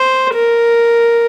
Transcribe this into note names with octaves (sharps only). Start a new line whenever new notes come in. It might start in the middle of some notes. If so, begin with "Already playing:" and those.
Already playing: C5
A#4